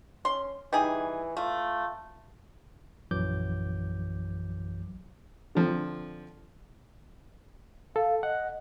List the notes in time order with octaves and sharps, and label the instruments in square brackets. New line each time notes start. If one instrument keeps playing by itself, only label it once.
[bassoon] C#4 [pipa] C6
[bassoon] E3 [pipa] G3 D#4 G#4
[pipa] A3 [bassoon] F4
[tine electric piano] A#1 F#2 E3 F#3 D6 G6
[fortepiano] D3 F3 C4
[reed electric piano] A4 [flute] F5
[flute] D#5 [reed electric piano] F#5